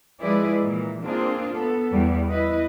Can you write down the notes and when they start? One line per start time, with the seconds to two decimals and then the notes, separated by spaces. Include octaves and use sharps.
0.20 F3 G#3 E4 G#4 B4 D5
0.62 A#2 E3
1.00 A#3 C4 D4 F4 G#4
1.51 B3 A4
1.91 E2 G3 B3
2.29 E4 B4 D#5